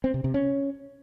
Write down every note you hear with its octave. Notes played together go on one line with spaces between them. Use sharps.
C4
C3
C3
C#4